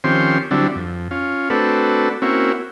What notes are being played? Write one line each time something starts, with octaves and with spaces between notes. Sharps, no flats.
D#3 F3 C4 C#4 G4 C6
D3 F#3 G3 C4 D4 E4
F2
C#4 F4
A3 C4 D4 F#4 A4 B4
A#3 C4 C#4 E4 F#4